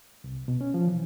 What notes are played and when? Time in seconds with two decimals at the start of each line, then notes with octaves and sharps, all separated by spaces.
0.24 C2
0.48 B2
0.61 C#4
0.74 F3
0.88 E3